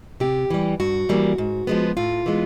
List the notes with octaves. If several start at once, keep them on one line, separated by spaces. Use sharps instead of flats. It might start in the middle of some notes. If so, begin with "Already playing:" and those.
C3 G4
E3 G3
G2 F#4
E3 G3 A#3
G#2
F3 G#3 B3
A2 F4
E3 G#3 B3